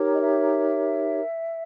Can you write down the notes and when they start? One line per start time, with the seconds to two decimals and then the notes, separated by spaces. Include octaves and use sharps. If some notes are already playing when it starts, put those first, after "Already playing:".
Already playing: D#4 G4 A#4 C#5
0.13 D#5
0.19 E5